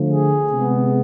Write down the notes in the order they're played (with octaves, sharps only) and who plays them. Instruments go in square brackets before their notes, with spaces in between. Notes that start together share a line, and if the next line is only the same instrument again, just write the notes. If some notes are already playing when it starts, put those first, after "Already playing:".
Already playing: [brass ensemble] D3 F3 A3
G#4
C3 G#3 B3